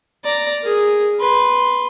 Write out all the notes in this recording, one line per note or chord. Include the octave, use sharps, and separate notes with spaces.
D5 A#5
G#4 A#4
B4 C6